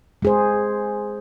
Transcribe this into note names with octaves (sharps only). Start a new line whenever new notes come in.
G#3 G#4 C5